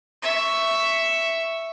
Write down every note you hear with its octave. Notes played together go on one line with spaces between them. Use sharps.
E5 C#6